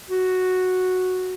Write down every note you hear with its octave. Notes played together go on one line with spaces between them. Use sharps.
F#4